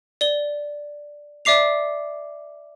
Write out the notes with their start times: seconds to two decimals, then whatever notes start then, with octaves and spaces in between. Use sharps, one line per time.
0.21 D5 G7
1.45 D5 E5 D6 C7 F7